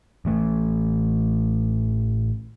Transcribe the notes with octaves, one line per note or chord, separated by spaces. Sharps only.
A1 E3 A3